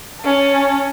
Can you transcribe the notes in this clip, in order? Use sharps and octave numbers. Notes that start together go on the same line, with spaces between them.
C#4 A5